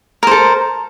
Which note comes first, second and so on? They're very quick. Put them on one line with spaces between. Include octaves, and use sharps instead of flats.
A#4 C5 A4